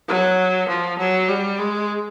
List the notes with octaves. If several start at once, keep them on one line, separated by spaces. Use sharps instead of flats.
F#3
F3
F#3
G3
G#3